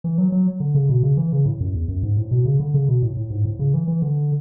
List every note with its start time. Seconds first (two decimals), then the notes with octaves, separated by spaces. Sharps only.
0.04 E3
0.18 F#3
0.32 F#3
0.60 D3
0.75 C#3
0.89 B2
1.03 C#3
1.17 E3
1.32 C#3
1.46 A2
1.61 F#2
1.74 E2
1.88 F#2
2.03 G#2
2.17 A2
2.31 B2
2.46 C#3
2.60 D3
2.74 C#3
2.89 B2
3.02 A2
3.17 A2
3.30 G#2
3.45 A2
3.59 C#3
3.74 E3
3.88 E3
4.02 D3